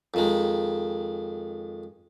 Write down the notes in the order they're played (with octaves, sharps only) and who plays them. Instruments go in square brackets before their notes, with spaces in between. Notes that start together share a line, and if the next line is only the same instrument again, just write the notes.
[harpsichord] F2 D#3 G#3